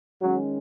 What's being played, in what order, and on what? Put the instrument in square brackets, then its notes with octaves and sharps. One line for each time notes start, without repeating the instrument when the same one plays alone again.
[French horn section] D#3 G#3 C#4 [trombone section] F#3